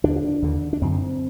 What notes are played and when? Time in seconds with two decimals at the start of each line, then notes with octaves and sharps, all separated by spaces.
0.04 D#2 D3 D4
0.42 D#2 D3
0.73 D4
0.82 F#2 D3 C4